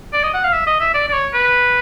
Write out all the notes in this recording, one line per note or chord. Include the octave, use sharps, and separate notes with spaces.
D5
D#5
F#5
F5
E5
D#5
E5
D5
D5
C#5
B4